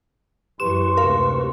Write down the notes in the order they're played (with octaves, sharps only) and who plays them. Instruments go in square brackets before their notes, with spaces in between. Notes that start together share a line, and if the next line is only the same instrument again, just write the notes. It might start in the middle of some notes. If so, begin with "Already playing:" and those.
[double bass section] F#2 E3 [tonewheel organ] G4 B4 C#6 [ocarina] C6 [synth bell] E7
[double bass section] D2 G#2 C3 [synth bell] A#4 F5